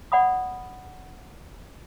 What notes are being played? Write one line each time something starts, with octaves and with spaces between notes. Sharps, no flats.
D5 F#5 B5 D#6